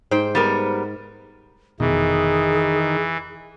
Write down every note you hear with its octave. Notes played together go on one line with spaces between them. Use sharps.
G#2 C5 G5
G3 B3 A#4
F1 B2 D#3 E3 G#4